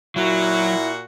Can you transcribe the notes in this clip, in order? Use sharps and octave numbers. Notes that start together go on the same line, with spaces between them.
A#2 F#3 E4 F#4